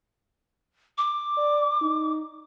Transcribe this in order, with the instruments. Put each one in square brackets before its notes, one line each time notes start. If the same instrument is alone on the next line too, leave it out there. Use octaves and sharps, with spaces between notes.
[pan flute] D6
[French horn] D5
D#4